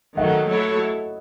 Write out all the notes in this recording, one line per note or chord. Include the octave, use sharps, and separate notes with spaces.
D#3 F#3 A3 D#5 F#5
F#3 A3 E4 A4 C#5